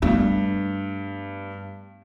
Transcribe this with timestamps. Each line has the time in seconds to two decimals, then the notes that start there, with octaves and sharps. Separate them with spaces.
0.02 G2 A3 B3